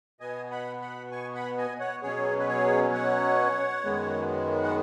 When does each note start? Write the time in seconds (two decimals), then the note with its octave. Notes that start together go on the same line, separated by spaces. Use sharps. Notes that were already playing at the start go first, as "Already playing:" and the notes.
0.20 B2 B3 D#5 G#5
0.51 F#5 B5
0.81 F#5 B5
1.11 G#5 C#6
1.35 F#5 B5
1.58 D#5 G#5
1.80 C#5 F#5
2.02 B2 F#3 C#4 G#4 C#5
2.39 B4
2.48 G#4 C#5
2.94 C#5 F#5
3.85 F#2 D#3 G#3 B3
4.63 F#5